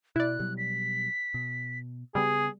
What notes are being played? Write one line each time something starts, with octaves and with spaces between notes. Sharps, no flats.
B2 E4 D5 F#6
B2 F#3 G3
B6
B2
C#3 G3 B3 G#4